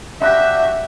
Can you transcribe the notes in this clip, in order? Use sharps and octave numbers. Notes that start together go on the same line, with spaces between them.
D4 F#4 G4 E5